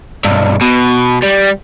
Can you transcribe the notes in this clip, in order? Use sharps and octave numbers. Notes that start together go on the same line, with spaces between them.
B1 G2
B2
G3